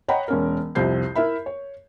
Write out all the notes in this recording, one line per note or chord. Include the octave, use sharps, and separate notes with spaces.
C#5 D#5 F#5 G5 A#5 B5
E1 C#4 A#4
C2 F2 C3 G6 C7
E4 A#4 E5 B5
C#5